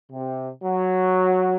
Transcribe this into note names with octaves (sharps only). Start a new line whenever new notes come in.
C3
F#3